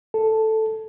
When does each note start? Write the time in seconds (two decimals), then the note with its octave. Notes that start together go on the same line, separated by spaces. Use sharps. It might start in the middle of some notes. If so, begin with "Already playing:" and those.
0.14 A4